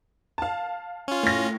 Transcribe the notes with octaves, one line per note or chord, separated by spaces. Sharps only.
F5 A5
C#4 F4
A2 A#6